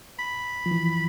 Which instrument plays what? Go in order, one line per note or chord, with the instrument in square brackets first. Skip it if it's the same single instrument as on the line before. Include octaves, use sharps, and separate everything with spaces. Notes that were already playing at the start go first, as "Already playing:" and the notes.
[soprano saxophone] B5
[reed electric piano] F3
E3